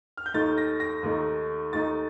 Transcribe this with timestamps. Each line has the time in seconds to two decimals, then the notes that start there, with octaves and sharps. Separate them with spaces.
0.17 F6
0.26 G6
0.34 D#2 D#3 A3 D#4 A6
0.58 A#6
0.80 A#6
1.03 D#2 D#3 A3 D#4
1.73 D#2 D#3 A3 D#4 A6